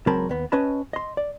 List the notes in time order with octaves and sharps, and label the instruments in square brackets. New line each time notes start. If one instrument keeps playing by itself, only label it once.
[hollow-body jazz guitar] C#2 F#3 C4 A#4 A5 B5
D#2 B3
C#4 B4 D#5 A5 B5
D#5 C6
D5